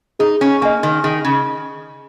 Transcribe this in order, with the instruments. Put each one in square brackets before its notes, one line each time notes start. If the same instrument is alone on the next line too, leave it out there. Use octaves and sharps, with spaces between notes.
[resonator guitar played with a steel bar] D#4 [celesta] G#4
[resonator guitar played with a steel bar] C#4
[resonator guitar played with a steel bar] A#3 [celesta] D#5 G#5 C#6
[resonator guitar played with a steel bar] D#3
[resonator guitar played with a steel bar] D#3 [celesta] G#4
[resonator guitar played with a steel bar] C#3